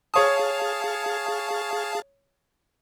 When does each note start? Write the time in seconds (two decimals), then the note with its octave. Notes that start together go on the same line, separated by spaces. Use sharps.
0.14 G#4 C#5 F5 A5 D#6